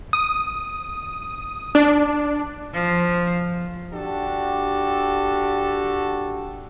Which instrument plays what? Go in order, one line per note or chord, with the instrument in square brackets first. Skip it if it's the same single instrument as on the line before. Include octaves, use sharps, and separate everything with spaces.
[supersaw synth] D#6
D4
[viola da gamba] F3
[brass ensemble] D4 F#4 G4 A4